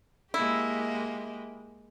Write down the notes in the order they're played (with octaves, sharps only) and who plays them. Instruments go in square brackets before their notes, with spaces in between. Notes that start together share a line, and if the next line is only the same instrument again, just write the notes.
[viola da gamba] G#3 A#3 G4 [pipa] E4